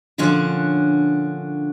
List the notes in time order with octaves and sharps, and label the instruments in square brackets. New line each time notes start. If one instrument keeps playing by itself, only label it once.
[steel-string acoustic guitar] A#2 D3 F3 C#4 D4 F#4